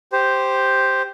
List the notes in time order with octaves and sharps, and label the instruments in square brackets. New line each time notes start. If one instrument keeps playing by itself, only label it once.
[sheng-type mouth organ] G4 C5